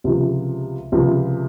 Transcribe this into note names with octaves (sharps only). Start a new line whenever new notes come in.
C#2 C3 F3
C#2 C3 F3